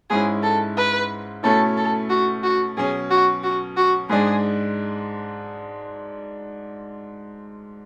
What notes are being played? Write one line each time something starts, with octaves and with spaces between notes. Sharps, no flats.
G#2 G#3 C#4 E4 G#4
A4
B4
B2 A3 C#4 E4 A4
A4
F#4
F#4
B2 F#3 C#4 G#4
F#4
F#4
F#4
G#2 G#3 D4 G#4